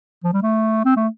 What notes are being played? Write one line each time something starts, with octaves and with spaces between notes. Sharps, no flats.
F3
G3
A3
C4
A3